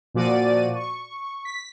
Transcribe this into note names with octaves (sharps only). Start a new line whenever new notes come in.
A#2 F3 F#4 D5 A6 D#7
C#6
B6